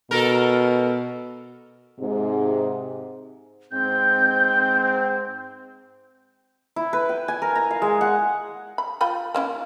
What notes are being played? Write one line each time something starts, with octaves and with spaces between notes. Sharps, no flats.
B2 A4 A#4
G#2 C3
G#2 C4 G6
E4
B4
G5
G#5
A#4
A#5
F5
G#3
F#5
B5
F4 G5 B5
A#3 C#4 E4